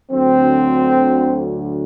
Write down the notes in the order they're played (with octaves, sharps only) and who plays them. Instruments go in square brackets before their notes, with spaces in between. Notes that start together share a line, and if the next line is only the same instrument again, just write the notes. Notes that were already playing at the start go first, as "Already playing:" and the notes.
[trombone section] D2 D3 F#3 C4